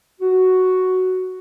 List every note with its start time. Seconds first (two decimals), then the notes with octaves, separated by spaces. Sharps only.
0.20 F#4